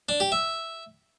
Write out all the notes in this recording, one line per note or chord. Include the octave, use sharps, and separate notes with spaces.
D4
G4
E5